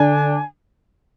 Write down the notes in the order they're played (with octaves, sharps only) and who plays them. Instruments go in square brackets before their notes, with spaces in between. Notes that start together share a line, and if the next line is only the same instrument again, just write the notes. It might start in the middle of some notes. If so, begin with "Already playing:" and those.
Already playing: [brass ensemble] D3 D4 [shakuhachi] G#5